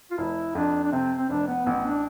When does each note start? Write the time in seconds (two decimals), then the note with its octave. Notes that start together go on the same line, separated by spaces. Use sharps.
0.11 F4
0.18 F1 E4
0.55 F2 D4
0.83 D4
0.92 C3 C4
1.18 C4
1.29 F1 D4
1.48 B3
1.66 A1 B3
1.84 D4